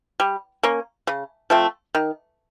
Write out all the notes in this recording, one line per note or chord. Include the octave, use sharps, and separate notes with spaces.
G3
A#3 C#4
C#3
F3 A3 C4
D#3